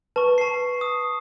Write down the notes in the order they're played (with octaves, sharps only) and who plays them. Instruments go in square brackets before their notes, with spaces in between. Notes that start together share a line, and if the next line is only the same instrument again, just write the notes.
[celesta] B4 [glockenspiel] A5 C#6
[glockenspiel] A5 C7
D#6